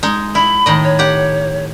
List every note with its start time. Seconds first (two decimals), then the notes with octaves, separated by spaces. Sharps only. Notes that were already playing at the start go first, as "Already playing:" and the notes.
0.03 G#3 D#4
0.35 E4 B5
0.66 A2 D#3 D#5
0.84 C#5
0.99 G4 F#5